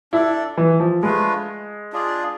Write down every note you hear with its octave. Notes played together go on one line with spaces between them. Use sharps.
D4 E4 A4 D5
E3
F3
G#3 A3 D4 F4 B4
D4 F4 G#4 D5